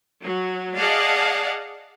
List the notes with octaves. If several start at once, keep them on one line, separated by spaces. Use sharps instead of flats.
F#3
G#4 D5 D#5 F5 F#5 A5